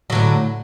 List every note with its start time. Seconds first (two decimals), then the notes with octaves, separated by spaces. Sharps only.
0.10 F#3
0.12 D3
0.15 A2